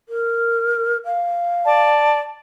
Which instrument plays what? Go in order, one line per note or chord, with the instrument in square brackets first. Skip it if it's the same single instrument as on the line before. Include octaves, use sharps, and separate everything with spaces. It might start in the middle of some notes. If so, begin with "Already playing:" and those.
[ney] A#4
F5
[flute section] D5 A5